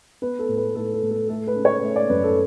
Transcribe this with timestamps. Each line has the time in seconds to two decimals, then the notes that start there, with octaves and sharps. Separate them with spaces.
0.22 B3 B4
0.39 A4
0.48 A2
0.57 B4
0.75 A2 A4
0.93 A4
1.02 A2
1.11 A4
1.29 A3 A4
1.47 B4
1.56 C#3
1.65 C#5
1.83 A3
1.96 D5
2.09 F#2 B4
2.24 A4